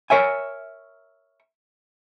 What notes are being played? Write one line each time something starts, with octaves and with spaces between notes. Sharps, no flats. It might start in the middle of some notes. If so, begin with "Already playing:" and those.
A#4 C#5 E5 G#5